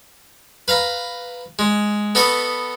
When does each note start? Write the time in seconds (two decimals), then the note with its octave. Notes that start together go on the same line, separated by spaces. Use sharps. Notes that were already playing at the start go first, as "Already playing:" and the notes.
0.68 B4 F5 A#5
1.59 G#3
2.15 B3 A4 D#5 B5 C#6